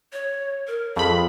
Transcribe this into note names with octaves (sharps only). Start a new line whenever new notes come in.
C#5
A#4
F2 G#4 B5